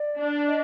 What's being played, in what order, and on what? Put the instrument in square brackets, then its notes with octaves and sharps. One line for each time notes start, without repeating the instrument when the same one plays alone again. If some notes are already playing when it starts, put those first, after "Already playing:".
Already playing: [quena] D5
[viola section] D4
[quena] D#5